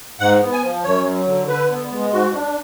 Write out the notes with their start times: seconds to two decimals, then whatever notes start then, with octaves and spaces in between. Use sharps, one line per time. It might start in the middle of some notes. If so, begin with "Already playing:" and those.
0.20 G#2 F#5
0.41 B3
0.52 G#5
0.63 F3
0.84 F#2 C#5
1.06 F#3
1.27 D3
1.49 D3 B4
1.70 B3
1.92 G#3
2.13 G#2 F#4
2.34 D4